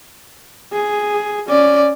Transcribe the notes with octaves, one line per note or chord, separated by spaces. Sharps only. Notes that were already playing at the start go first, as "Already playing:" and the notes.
G#4
C#4 D5